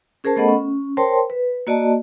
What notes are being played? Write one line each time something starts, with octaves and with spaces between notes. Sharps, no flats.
C#4 G#4 A#4 C5 A5
A3 B3 A4 D#5 F#5 B5
C#4
A#4 C5 C#5 G5 A5 C6
B4
A#3 F#4 D5 D#5 A5